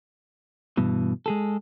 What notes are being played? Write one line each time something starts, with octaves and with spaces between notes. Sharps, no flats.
G2 B2 E3
G#3 G#4 A4